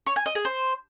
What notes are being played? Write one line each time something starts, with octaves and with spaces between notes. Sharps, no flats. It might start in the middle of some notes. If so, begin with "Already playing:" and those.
C#5
G#5
D#5
G#4
C5